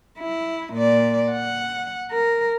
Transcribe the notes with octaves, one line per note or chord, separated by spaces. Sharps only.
E4
A#2 D5
F#5
A#4